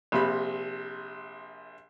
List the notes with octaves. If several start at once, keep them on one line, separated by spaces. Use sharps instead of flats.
A#1 C3 B5